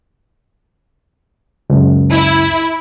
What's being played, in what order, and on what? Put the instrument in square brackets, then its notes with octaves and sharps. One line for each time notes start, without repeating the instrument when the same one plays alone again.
[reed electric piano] C#2 F#2
[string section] E4